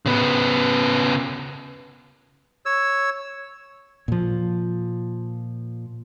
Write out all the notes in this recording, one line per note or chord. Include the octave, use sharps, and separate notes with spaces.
C#3 B3
C#5 E6
A#2 F3